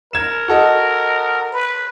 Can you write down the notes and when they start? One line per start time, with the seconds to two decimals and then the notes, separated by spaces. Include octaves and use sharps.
0.13 A#4 G#6 E7
0.48 F#4 A4 D#5
1.52 B4